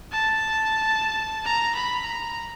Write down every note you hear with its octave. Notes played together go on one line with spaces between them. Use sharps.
A5
A#5
B5
A#5